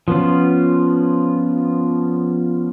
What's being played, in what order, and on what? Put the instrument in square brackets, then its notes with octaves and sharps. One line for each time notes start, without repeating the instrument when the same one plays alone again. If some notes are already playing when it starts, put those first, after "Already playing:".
[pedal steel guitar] F3 B3 C#4 F4